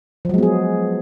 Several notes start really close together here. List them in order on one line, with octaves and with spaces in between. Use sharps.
F3 F#3 G#3 B3 G#4